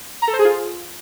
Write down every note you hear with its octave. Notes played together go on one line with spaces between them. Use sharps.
A#5
A4
C5
G#4
F4